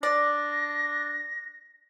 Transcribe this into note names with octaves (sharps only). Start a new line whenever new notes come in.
D4 D5 A#6